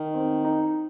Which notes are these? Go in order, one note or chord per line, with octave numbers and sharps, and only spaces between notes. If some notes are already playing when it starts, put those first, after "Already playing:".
Already playing: D#3
C4
D#4